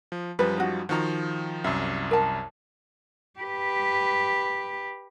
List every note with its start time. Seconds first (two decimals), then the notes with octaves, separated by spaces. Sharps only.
0.12 F3
0.39 F#2 F3 G3 B4
0.58 D#4 F#4
0.89 D#3 F3 F#4 A#5
1.64 C2 F#2 E5
2.11 A#4 A5
3.39 G4 B4